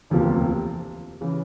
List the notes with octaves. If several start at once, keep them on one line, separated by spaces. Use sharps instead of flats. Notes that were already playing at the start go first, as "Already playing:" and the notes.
E1 D2 C3 F3 A#3
C#3 E3